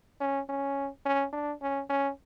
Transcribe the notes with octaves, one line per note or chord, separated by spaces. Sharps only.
C#4
C#4
C#4
D4
C#4
C#4